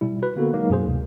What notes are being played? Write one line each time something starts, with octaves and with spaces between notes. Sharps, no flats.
B2 G3 E4
F#4 B4
D3 A#3 B3 F#4 A4
F#3 G#3 A#3 D#4
F#2 B2 G#4 C5
D2 C3